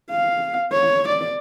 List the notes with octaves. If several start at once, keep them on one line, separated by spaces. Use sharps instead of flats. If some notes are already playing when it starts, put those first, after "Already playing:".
F5
C#5
D5